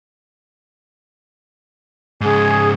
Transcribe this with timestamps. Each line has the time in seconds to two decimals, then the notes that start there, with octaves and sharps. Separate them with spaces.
2.21 G#2 C#3 G#4